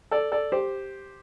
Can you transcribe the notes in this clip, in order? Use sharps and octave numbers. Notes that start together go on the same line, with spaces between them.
A4 D5
A4 D5
G4 C5